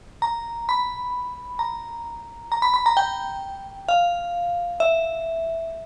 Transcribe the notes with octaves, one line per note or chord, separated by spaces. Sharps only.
A#5
B5
A#5
A#5
B5
B5
A#5
G5
F5
E5